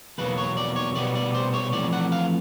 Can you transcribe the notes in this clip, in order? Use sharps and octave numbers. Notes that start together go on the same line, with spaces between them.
E2 B2 F#3 A#3 B4
C#5
D5
C#5
B2 G3 B3 D5
D5
C5
C#5
F2 C3 E3 A3 D5
F#5
F5